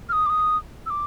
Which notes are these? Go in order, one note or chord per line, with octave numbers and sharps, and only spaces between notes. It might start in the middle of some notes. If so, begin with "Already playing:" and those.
F6
D#6
D6
D#6
E6
D6